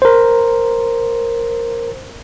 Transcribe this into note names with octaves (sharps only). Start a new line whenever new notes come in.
A#4 C5